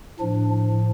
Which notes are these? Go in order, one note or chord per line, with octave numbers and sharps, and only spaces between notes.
A2 F3 D4